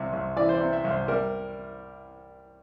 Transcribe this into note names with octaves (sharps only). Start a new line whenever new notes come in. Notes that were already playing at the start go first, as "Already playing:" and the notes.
Already playing: C2 C3
C2
E3 D5
C5
D5
C3
E5
C2
C5
G3 A#4